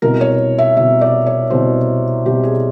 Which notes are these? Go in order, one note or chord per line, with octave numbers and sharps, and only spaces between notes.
C2 B2 A#4
C#5
E5
C2 B2 E5
D5
C#5
C2 B2 C5
C2 B2 G4
G#4